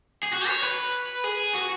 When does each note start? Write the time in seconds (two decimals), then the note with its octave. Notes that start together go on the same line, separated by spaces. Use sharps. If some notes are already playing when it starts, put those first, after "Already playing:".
0.23 G#4
0.33 F#4
0.48 C#5
0.63 B4
1.24 G#4
1.55 F#4